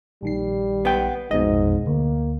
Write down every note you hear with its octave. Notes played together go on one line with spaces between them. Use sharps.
A#1 D#3 G3 C7
B3 G5
A#1 F2 G#2 B2 D#5
D2 A#3